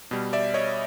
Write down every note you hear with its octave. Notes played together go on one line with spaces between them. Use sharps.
B2 G3
D5 E5
C#5 D#5